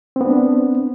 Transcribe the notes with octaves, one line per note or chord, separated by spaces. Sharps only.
B3 C4 D4